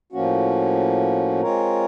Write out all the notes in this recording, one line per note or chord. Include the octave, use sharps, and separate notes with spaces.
A2 F3 A#3 C#4 F#4
G#3 C4 F4 A#4 C#5